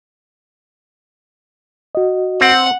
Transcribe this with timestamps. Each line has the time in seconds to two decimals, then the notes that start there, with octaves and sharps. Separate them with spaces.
1.95 F#4 D#5
2.41 C4 F#5